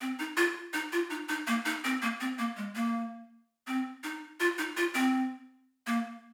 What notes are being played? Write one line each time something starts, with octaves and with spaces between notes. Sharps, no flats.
C4
D#4
F4
D#4
F4
D#4
D#4
A#3
D#4
C4
A#3
C4
A#3
G#3
A#3
C4
D#4
F4
D#4
F4
C4
A#3